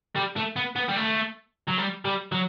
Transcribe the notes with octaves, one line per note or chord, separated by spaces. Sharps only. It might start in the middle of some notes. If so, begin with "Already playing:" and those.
G3
A3
B3
B3
G3
A3
F#3
G3
G3
F#3